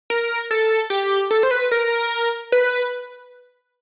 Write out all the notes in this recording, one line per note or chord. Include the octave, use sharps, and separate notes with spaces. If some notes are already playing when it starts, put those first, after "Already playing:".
A#4
A4
G4
A4
C5
B4
A#4
B4